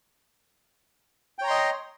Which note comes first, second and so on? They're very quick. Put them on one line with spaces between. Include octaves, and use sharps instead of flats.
G5 C#5 A#5 C6 D#5